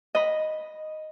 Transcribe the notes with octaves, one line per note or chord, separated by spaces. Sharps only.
D#5 B5